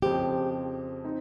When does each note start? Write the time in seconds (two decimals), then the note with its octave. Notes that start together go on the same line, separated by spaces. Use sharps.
0.02 F2 C#3 F3 C4 G4
1.04 C4 D#4